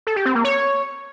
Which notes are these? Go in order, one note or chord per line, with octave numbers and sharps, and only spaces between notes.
A4
G4
C4
A#3
C#5